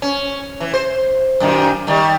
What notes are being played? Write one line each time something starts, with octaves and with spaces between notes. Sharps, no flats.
C#4
E3
C5
F#2 A#2 D#3
D#3 G3